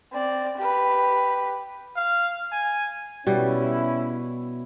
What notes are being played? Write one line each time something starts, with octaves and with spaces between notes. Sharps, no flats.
C4 D5
G4 B4
F5
G#5
B2 G3 C#4 E4